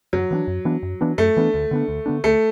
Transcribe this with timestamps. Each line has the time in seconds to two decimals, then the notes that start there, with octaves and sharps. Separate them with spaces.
0.13 F#2 F#3
0.31 E3 B3 D4
0.47 F#2
0.65 E3 B3 D4
0.83 F#2
1.01 E3 B3 D4
1.18 F#2 A3
1.37 E3 B3 D4
1.54 D2
1.71 D3 B3 D4
1.88 D2
2.06 D3 B3 D4
2.24 D2 A3